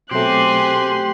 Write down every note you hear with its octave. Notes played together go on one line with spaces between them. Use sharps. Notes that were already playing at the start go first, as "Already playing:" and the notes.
B2 F#3 A3 C4 G4 G#4 C6 F#6